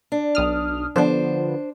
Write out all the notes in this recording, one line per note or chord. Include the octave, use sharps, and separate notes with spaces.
D4
B1 D#6 F6
D3 F3 B3 D4 C5